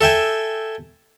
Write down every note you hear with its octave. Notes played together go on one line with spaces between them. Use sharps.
A4 E5 G5 G#5